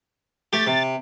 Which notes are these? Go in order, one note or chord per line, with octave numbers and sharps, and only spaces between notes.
A3 G4 A6
C3